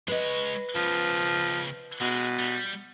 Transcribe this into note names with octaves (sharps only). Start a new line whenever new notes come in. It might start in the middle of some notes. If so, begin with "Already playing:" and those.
G#3 B4 C#5 D#5
C#3 F3 B3
B2 G#3
G3